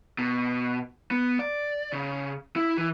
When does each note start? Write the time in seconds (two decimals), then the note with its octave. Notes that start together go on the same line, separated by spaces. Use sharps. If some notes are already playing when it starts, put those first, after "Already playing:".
0.18 B2
1.11 B3
1.39 D5
1.93 C#3
2.56 E4
2.78 E3